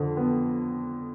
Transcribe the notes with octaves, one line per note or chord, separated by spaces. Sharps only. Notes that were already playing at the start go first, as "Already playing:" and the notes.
Already playing: F2 D3
B3